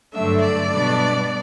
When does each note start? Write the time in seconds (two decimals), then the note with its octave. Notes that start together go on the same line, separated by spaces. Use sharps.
0.13 G2 D3 F#3 A3 D4 E5
0.41 D5
0.70 B2 G3 B3 D4